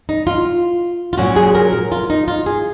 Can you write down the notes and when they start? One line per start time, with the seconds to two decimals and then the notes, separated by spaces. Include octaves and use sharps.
0.09 D#4
0.27 F4
1.13 F4
1.18 A#2 F#3 C#4 F#4
1.36 G#4
1.55 A#4
1.73 A#4
1.92 F4
2.10 D#4
2.28 F4
2.46 G#4